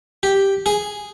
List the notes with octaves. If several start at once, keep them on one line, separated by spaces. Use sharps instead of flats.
G4
G#4